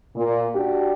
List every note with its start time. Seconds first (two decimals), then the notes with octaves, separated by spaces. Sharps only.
0.16 A#2
0.53 D4 F#4 G4